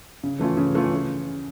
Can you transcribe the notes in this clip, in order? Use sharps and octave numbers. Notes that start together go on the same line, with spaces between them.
C#3
E3 A3 C#4 F4
C#3
E3 A3 C#4 F4
C#3